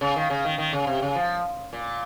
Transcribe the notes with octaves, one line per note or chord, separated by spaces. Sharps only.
C#3
D#3
C#3
D#3
D#3
C#3
C3
C#3
F3
A#2